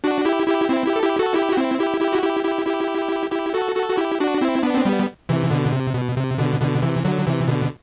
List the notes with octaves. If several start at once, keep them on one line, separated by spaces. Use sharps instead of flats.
D4 F#4
E4 G4
E4 G4
C4 E4
E4 G4
A4
E4 G4
F#4 A4
E4 G4
F#4
C4 E4
E4 G4
E4 G4
F#4
E4 G4
E4 G4
E4 G4
E4 G4
F#4 A4
F#4 A4
F#4
E4 G4
D4 F#4
C4 E4
B3 D4
C4
G3 B3
C3 E3
B2 D3
C3
B2
C3
B2 D3
B2 D3
C3 E3
D3 F#3
C3 E3
B2 D3